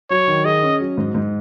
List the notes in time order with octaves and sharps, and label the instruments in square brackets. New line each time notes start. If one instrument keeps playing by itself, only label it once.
[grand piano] F#3 [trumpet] C#5
[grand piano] D#3
[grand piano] G#4 [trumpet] D#5
[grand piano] C#4
F#3
G#2
G#2